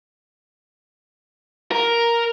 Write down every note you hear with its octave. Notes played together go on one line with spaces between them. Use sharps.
A#4